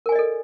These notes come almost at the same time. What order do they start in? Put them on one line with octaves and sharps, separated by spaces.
A#4 G#5 D5 D#5 A4